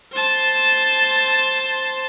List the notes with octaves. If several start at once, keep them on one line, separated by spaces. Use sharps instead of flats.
C5 A5